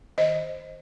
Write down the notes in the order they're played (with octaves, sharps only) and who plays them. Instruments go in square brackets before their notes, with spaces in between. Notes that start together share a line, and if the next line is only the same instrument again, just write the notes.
[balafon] D#3 C5 D#5